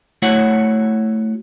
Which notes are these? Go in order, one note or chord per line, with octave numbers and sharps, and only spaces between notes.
A3 E4 F#4 C#5 F#5